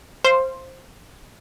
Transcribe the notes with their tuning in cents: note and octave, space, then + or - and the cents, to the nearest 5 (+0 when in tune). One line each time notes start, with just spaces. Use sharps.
C5 +10 F5 -20